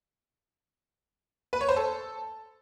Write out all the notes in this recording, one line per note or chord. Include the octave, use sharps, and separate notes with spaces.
B4
C#5
C5
A4